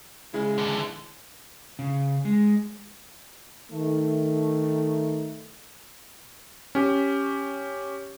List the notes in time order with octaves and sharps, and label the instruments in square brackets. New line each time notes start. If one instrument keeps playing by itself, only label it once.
[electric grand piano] C#3 E4 [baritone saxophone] G#3
[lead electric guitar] D3 E3
[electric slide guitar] C#3
G#3
[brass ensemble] D#3 A3
[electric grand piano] C#4 G4